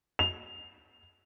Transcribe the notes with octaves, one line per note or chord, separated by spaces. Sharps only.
F7